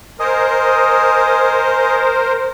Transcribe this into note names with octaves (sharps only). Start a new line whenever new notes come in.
A#4 C5 D#5 G#5 D#6